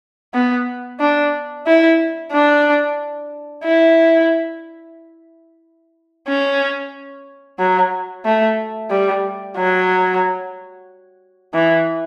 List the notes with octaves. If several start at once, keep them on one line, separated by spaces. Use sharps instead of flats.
B3
D4
E4
D4
E4
C#4
F#3
A3
G3
F#3
E3